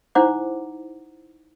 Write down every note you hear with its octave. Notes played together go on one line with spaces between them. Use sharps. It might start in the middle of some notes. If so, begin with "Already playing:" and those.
D#4 E4 C5 F#5 A#5 D6